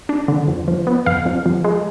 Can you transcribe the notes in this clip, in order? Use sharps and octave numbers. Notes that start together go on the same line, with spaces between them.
D4
D3
F2
F3
B3
F2 F5
F2
F3
G#3